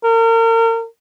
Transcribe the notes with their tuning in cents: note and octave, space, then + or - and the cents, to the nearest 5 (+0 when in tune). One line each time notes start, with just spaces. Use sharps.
A#4 -35